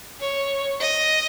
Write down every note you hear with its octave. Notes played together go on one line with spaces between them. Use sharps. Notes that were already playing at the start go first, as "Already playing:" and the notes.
C#5
D#5